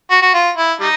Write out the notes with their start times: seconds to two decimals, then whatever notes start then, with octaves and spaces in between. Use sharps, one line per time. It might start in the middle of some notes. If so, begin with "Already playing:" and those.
0.11 F#4
0.22 F#4
0.34 F4
0.57 E4
0.80 G3 D#4